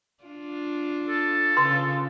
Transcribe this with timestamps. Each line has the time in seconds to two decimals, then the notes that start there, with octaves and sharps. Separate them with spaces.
0.24 D4 F4
1.09 A4
1.57 C#3 F4 C6